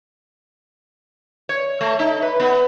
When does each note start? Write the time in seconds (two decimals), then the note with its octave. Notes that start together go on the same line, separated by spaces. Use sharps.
1.49 C#5
1.81 A3
1.99 D#4
2.22 B4
2.40 B3